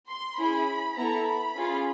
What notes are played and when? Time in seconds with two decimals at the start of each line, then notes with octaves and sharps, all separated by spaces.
0.09 C6
0.38 C#4 E4 G#4 B5
0.97 B3 E4 A4 A#5
1.27 B5
1.56 C#4 F4 G#4